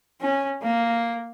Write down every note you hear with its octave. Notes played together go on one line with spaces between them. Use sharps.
C#4
A#3